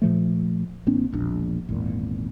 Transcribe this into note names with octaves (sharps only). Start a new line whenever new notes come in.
A#2 F3 A3
A1 A#3 C4 D4
E1 A#1 D4
G#1 E2 A#2